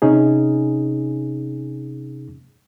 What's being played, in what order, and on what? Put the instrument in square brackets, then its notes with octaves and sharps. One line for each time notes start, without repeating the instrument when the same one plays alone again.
[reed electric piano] C3 C#4 D#4 G#4